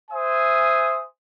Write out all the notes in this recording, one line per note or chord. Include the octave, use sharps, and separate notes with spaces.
C5 E5 G#5 D#6